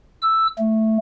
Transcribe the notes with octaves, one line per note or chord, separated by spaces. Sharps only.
E6
A3